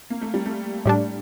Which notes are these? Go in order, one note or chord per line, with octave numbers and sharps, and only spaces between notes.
A#3
A3
G3
A3
A2 G3 D4